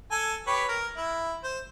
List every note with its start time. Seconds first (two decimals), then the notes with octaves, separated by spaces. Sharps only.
0.11 A4 G#5
0.47 G4 B4 C#5
0.68 A#4
0.97 E4
1.44 C5